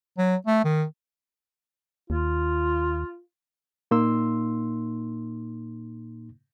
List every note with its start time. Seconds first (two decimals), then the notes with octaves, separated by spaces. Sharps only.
0.18 F#3
0.47 A3
0.64 D#3
2.10 D#2 F4
3.91 A#2 A#3 D#4 C6 E6